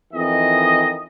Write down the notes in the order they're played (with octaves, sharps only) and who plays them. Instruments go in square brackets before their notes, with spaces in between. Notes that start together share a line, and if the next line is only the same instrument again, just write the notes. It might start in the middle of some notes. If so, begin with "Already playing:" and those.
[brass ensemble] F2 D#3 E3 D#5